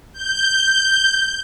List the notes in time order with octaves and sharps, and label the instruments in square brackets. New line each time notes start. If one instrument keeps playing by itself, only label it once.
[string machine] G6